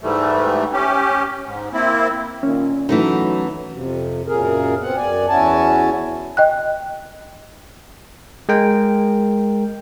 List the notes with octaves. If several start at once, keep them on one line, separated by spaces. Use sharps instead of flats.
G#2 E3 G3 A3
C#4 G4
G#2
A#3 C4 E4
A#2 D#3 C#4
E3 F#3 A3 D#4 F#4
F2 C3
F#2 A#2 C#3 G#4 A#4
B3 C4 F#5
F#2 D5 G#5
E2 C#4 E4 F#4 G#5 A5
D#5 G5 F#6
G#3 A#4 G5